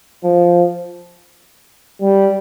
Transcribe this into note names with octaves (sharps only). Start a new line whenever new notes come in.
F3
G3